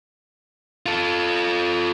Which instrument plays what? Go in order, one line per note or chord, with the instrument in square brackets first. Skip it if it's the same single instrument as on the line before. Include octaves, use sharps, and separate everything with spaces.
[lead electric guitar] F4 A4